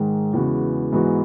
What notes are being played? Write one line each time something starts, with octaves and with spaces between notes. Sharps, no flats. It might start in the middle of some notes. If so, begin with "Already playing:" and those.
Already playing: G#2 D#3 G#3
E2 C#3 G#3 B3 F#4
G#2 E3 G#3 B3 F#4